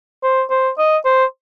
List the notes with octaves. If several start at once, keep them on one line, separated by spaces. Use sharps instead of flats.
C5
C5
D#5
C5